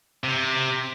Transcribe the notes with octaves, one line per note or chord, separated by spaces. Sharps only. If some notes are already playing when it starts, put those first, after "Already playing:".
C3